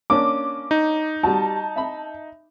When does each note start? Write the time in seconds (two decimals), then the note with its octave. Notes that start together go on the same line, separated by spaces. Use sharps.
0.10 A#3 C#4 D4 D6
0.71 D#4
1.23 G3 F#4 A5
1.76 E5 B5